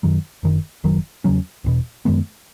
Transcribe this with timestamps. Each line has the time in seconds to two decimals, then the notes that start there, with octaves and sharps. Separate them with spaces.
0.03 F#2 D#3 F#3
0.43 F#1 F#2 D#3
0.84 F#1 F#2 D#3 F#3
1.24 E2 C#3 F#3 C#4
1.64 E1 E2 B2
2.05 F#2 D#3 G#3 B3